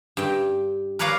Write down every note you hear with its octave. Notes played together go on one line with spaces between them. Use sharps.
G2 G5
A#4 B4 C#5 D5 F5 A#5